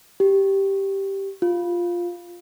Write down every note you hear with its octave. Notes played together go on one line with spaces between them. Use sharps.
G4
F4